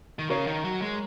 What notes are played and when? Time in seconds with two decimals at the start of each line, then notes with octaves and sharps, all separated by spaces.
0.19 D#3
0.30 C#3 A#4 C#5
0.47 D#3
0.64 F#3
0.82 G#3